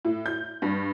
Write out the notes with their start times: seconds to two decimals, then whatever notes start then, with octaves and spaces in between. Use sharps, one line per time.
0.05 A2
0.26 G6
0.62 G2